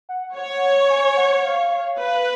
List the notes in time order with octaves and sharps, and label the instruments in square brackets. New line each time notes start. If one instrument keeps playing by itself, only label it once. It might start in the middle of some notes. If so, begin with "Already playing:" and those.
[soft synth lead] F#5
[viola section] C#5
[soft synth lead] G#5
F#5
F5
F5
[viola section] B4 [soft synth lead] F5